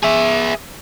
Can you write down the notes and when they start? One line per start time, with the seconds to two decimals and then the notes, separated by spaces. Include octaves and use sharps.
0.03 G#4 E5